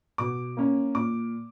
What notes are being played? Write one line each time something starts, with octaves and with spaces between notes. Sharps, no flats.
B2 D6
A#3 C#4
A#2 D6